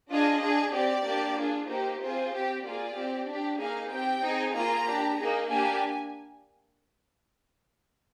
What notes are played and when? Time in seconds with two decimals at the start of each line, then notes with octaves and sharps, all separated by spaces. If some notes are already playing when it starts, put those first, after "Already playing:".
0.09 D4 F4 G#4 D#5
0.42 D4 G#4
0.73 C4 G4 D5
1.05 A#3 D4 G4
1.36 D4 F4 G#4
1.68 A#3 D#4 G4 C5
2.00 C4 F4 G#4 C5
2.32 C4 G4
2.64 A#3 F4 G#4 D5
2.95 C4 G4
3.27 D4 G4
3.59 A#3 D#4 G#4 F5
3.91 C4 G4 G5
4.23 C4 D#4 G#4
4.55 A#3 F4 G#4 A#5
4.86 D4 G4
5.18 A#3 D#4 G#4
5.49 A#3 D4 G4 G#5